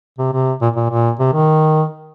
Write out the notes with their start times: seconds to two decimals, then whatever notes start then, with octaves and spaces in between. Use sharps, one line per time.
0.19 C3
0.33 C3
0.62 A#2
0.76 A#2
0.90 A#2
1.19 C3
1.33 D#3